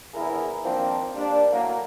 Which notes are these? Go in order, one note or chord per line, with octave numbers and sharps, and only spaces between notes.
A#1 E2 E4 G#4 A#4
D#3 F3 A#3 C4 D4
G3 A#3 D4
A2 F#3 A#3